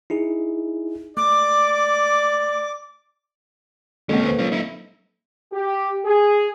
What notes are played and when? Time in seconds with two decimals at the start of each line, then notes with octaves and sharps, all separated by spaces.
0.10 D#4 E4 G#4
1.17 A3 D5 D6
4.09 D2 G#3 A#3 C4 C#4 A4
4.23 B4 C5
4.39 F#3 C#4 F4
4.52 D#4 E4
5.52 G4
6.05 G#4